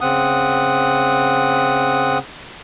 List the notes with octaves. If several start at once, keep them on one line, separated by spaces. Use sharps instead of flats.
C#3 C4 F#5 D#6